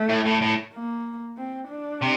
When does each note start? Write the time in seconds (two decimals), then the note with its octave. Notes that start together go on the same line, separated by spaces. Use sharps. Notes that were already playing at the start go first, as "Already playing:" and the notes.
Already playing: A3
0.09 A2
0.25 A2
0.41 A2
0.74 A#3
1.38 C4
1.69 D4
2.02 C3